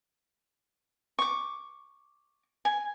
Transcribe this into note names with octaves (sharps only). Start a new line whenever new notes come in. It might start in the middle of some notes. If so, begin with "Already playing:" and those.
C#6 D6
G#5